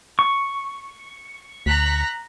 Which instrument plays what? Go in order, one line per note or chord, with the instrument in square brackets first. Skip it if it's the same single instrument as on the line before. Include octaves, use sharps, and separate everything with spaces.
[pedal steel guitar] C#6
[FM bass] D2 [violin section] A#5 F#6 B6